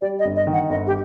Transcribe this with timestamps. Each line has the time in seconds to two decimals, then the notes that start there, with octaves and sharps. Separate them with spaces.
0.01 G3 D5
0.19 D#5
0.25 G1
0.36 D#5
0.47 D#3
0.53 F#5
0.70 G1 D#5
0.87 G4